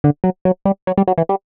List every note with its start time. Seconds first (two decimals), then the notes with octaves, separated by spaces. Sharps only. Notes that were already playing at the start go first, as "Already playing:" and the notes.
0.04 D3
0.24 F#3
0.45 F#3
0.65 G3
0.87 F#3
0.98 G3
1.08 F#3
1.18 E3
1.29 G3